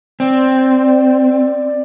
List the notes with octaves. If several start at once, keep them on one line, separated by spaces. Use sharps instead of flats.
C4 D5